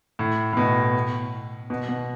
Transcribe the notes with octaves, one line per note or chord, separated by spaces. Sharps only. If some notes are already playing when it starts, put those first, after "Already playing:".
A2
A2
B2
B2
B2